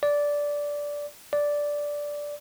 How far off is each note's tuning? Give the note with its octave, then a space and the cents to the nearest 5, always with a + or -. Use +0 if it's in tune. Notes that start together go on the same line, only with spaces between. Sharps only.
D5 -10
D5 -5